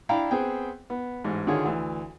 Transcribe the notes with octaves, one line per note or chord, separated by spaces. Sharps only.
D4 E4 F5 G5 A#5 B5
B3 C4 G#4 F#5 G5
B3
A1 G#2
D3 D#3 F4 F#4 G#4 C#5
D2 E3